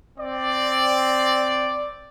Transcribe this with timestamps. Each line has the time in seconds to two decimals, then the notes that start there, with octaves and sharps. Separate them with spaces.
0.19 C4 D5